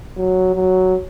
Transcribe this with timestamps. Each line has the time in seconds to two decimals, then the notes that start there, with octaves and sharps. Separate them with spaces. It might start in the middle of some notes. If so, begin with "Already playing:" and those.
0.17 F#3
0.55 F#3